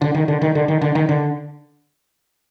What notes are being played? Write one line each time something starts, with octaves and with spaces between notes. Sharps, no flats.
D3
D#3
D3
D#3
D3
D#3
D3
D#3
D3